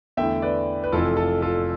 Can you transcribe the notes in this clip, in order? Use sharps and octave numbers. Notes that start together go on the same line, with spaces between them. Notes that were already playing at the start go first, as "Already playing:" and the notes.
E2 D3 A3 E4 E5 G5
B4 D5
B4
F1 F2 E3 F4 A4
F4 A4
F4 A4